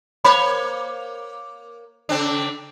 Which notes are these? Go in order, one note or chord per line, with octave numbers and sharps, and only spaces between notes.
A#3 C5 C#5 B5
C#3 C4 D4